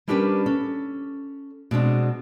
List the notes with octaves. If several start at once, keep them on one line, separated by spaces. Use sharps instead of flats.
G3 C#4 D4 G4 A#4 B4
C#4 A4
B2 G#3 C4 D4